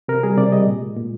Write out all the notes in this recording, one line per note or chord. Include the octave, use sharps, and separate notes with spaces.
C3 A#4
G3 G#4
C3 D5
G3 D#5
A#2
G#3
A#2